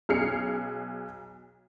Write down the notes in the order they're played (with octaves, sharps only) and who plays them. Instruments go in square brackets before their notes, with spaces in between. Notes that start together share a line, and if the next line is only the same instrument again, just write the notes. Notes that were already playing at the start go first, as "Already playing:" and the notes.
[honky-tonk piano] B1 G#4 F6 C7 C#7